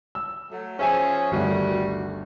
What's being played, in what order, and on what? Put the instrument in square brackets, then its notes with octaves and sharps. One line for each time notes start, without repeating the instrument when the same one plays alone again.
[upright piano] E6
[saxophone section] F#3 A3
[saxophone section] F3 C#4 G#4 [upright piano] C5 E5 G#5
[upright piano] G1 D2 A3 [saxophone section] D#3 G3 F#4